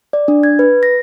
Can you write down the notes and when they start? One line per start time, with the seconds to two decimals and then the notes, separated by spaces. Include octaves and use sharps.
0.13 D5
0.28 D4
0.43 G#6
0.59 B4
0.83 A#6